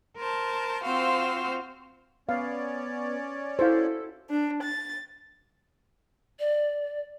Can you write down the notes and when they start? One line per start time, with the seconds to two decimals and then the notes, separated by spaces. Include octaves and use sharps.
0.17 A#4 C5 A5
0.85 C4 F4 F#4 C5 F5 E6
2.29 B3 C#4 C#5 D5 F5
3.59 E4 F#4 A4 C5 F5
4.30 D4
4.62 A6
6.40 D5